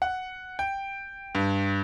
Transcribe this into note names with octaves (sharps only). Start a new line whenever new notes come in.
F#5
G5
G2